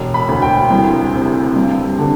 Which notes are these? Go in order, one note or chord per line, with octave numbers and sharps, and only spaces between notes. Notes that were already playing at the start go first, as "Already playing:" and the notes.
Already playing: E1
B5
D2
G5
C2
C3
G2
D3